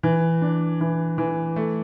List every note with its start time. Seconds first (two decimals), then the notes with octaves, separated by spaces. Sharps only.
0.03 E3
0.42 D4
0.81 E3
1.18 E3
1.56 A3